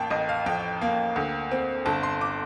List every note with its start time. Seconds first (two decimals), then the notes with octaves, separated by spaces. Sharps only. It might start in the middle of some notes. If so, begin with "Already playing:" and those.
Already playing: A1 A#3 G5 A5
0.11 A1 D#5
0.29 F5
0.46 F2 G5
0.81 A#3
1.16 D2
1.51 C4
1.86 G1 A5
2.03 C6
2.21 D6